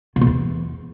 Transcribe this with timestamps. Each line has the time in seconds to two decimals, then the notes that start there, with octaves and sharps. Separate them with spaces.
0.16 C3
0.21 B2
0.27 E2